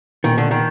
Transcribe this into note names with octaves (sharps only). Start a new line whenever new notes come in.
A#2 D#3
D3
D#3